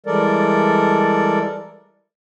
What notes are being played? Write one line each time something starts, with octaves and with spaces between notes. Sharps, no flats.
E3 G3 G#3 A4 A#4 D5